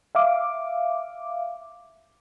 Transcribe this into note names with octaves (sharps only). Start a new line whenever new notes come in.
E5 F5 D6